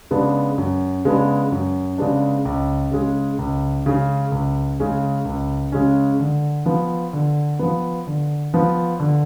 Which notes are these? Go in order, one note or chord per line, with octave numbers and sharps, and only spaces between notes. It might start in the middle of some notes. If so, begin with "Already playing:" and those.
C#3 G#3 B3 D4
F#2
C#3 G#3 B3 D4
F#2
C#3 G#3 B3 D4
C#2
C#3 G#3 C#4
C#2
C#3 G#3 C#4
C#2
C#3 G#3 C#4
C#2
C#3 G#3 C#4
D3
F3 B3
D3
F3 B3
D3
F3 B3
D3